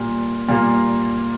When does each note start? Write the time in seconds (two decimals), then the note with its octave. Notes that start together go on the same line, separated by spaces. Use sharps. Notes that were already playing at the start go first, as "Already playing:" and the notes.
Already playing: A#2 G3 A#3
0.49 A#2 G3 A#3